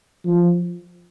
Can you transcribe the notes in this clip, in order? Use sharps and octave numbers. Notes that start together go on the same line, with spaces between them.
F3